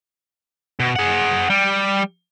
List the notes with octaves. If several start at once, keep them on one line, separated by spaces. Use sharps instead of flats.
B2
G#4 F#5
G3